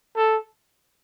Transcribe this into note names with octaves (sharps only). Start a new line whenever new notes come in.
A4